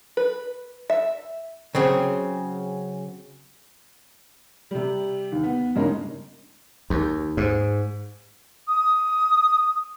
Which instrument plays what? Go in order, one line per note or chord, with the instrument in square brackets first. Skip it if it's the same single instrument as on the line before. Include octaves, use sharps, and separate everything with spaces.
[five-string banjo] B4
E5
[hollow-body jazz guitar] C#3 F#3 C4 G#4
[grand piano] C3 G3
D#2
B3
G2 C#3 G#3 A#3 C#4 D#4
[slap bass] D#2
G#2
[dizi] D#6